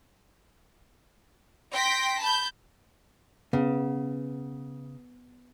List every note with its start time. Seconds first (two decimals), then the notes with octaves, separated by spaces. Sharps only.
1.72 G5 C6 A#6 B6
2.20 A5 B5 G6
3.53 C#3 B3